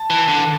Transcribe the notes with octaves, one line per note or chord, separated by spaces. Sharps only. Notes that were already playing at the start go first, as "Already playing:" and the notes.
Already playing: A5
E3
D3